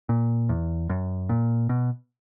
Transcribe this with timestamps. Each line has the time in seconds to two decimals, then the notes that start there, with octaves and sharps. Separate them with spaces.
0.09 A#2
0.49 E2
0.89 F#2
1.29 A#2
1.69 B2